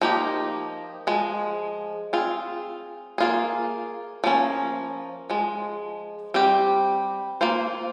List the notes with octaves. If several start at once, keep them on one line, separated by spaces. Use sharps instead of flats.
F3 A#3 D#4 G4
F3 G#3
C4 F4 G#4
A#3 F4 G#4
F3 A#3 C#4
F3 G#3
G3 C4 G4
A#3 F4 C5